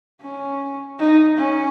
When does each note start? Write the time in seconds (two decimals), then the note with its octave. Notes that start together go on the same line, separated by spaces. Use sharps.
0.22 C#4
0.99 D#4
1.38 C#4